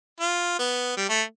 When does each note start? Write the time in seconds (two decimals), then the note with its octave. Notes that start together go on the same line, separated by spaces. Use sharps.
0.20 F4
0.59 B3
0.97 G3
1.09 A3